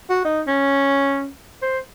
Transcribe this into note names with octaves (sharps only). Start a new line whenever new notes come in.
F#4
D#4
C#4
C5